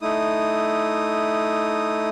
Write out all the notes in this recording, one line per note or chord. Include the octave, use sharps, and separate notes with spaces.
A3 D#4 E4 D#6